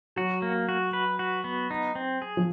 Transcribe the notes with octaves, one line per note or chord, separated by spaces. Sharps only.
F#3 F#4
A#3
F#4
B4
F#4
B3
D#4
C4
G#4
F3